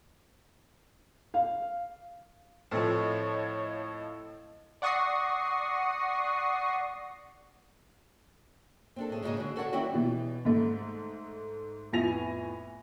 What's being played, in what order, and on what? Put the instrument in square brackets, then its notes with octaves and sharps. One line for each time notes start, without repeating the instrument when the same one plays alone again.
[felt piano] F5
[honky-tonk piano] A2 F3 [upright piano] C4 A4 [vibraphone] E4 D#5 F5 [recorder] C#5
[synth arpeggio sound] D5 F#5 C#6 D#6 A#6 C7
[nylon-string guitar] C4 D4 A4
A2 G#4
G#2 C#3 C#4 D#4 G#4 D#5
D3 F#4
F#4 A4 C#5 D5 F5 F#5
D#3 G3 C4 C#4 E4 F#4
[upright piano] B2 E3
G#2 A3
F2 A2 B3 G#5 A#6 F7